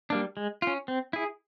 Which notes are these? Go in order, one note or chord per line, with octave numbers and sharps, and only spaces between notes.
G3 A#3 D4
G#3
C#4 F4
C4
E4 G#4